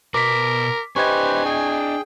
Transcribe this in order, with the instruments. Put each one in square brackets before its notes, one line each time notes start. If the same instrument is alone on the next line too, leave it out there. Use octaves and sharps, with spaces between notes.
[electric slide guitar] B2 B4 [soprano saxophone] A#4 [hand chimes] D6 B6
[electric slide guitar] D4 D#5 [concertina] G4 B4 C5 [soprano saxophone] G#5 [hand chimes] C#6 G#6
[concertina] G#4 G5